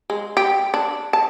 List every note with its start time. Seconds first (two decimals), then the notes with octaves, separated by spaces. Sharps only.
0.10 G#3
0.37 G4
0.74 D4
1.13 A5